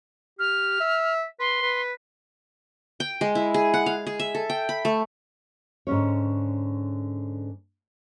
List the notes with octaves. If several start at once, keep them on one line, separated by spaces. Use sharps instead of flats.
G4 F6
E5
B4 C6
B4
G5
G#3
E4
G#4
F#5
F5
G#4
E5
A4
G5
B5
A3
G#2 D3 C#4 C#5